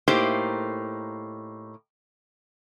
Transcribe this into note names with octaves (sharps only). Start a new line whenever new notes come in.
A2 A#3 D#4 G4 C5